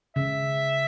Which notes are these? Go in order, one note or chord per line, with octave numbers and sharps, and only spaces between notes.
C#3 E5